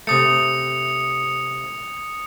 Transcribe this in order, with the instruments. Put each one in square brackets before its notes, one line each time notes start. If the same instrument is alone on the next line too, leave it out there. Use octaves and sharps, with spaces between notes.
[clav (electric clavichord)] C3 A3 [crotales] D#6 C#7